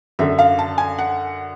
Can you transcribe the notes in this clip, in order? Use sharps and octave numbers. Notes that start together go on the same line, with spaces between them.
F#2 D3 E5
F5
A5
G#5
F#5